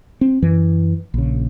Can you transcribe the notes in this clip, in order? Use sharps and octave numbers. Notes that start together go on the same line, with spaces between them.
C4
F#2 E3
A#1 C#3